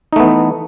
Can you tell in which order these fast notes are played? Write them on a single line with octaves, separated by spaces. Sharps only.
D#4 A3 B3 E3